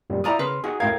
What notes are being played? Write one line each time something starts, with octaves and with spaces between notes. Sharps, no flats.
F#2 A#2 G3
E4 F4 D5 A#5 D#6
C#3 B4 C6 F6
D#4 F#4 G#4
A2 A#4 F5 G5 G#6